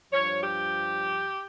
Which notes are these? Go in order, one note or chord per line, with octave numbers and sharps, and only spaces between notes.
G2 F3 C#5
G4